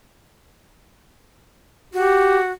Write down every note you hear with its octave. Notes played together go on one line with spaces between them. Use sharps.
F#4 G4